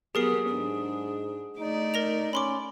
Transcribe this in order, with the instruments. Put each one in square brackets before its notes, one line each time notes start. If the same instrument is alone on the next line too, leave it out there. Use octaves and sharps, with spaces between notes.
[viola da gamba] F#3 B3 [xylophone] G4 A#4 C7 [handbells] G#4 D#6
[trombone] G#2 [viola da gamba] D4
[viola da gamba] A3 D5 [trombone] D#4
[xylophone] A#4 A#6 F7
[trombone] C#4 [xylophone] B5 C6 D6